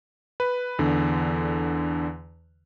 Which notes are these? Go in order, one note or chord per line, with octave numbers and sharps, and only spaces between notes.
B4
E2 D3